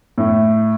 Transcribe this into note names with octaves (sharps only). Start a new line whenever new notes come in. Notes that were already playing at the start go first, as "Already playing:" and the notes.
A2